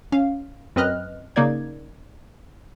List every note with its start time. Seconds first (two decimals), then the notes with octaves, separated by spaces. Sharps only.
0.12 C#4 F5
0.76 F#2 C4 B4 D#5 F6 F#6
1.36 C#3 A#3 D#4 D5 G#6